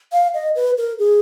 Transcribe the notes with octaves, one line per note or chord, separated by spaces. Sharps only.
F5
D#5
B4
A#4
G#4